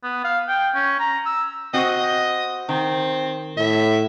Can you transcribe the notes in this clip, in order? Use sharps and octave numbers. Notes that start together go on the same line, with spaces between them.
B3
F5
G5
C#4
A#5
E6
C4 F#4 D#5
D#3 C4
A2 E5